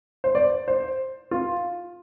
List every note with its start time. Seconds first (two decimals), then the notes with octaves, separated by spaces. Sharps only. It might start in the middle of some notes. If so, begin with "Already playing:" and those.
0.24 C5
0.35 D5
0.68 C5
1.31 F4